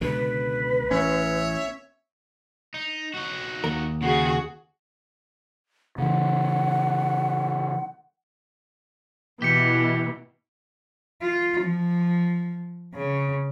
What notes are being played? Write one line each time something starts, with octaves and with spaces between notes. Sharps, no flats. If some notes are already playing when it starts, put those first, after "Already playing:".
C#2 B2 D3 B4
A1 C#4 C#5 E5
D#4
D#4 F#4
D#2 A#4
C#3 F#4 G#4
C#3 E3 F#5
B2 E3 G4 B6 C#7
F4
F3
C#3